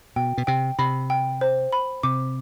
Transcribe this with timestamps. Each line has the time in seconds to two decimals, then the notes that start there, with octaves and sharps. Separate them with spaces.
0.16 B2 G5
0.38 B2
0.47 C3 G5
0.79 C3 B5
1.10 G5
1.41 C5
1.73 B5
2.03 C3 D6